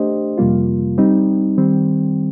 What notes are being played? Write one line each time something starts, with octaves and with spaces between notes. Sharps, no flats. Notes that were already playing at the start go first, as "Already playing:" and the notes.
Already playing: A3 D4 G4 C5 D#5
F2 C3 G3 A#3 F4
G3 C4 D#4
D#3 G3 C4